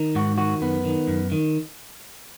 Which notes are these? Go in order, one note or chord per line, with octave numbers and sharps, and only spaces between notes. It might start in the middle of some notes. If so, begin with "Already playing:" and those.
Already playing: D#3
G#2 F#4
D#3 F#4
F#2 B3
D#3
F#2
D#3